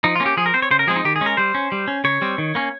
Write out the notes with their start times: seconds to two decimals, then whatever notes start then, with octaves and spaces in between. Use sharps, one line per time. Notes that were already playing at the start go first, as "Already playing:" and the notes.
0.04 F3 D#4
0.15 A#3 C#4 F4
0.26 G4
0.37 F3 G#4
0.46 A#4
0.54 C4 C5
0.62 C#5
0.71 C#3 C5
0.79 A#4
0.87 F3 G#3 C4 G#4
0.96 D#4
1.05 D#3 G4
1.16 G#4
1.21 G#3 C#4
1.26 A#4
1.37 G3 C5
1.54 C#4
1.72 G3
1.88 C#4
2.04 C#3 C#5
2.22 G3 C4
2.38 D#3
2.55 A#3 C#4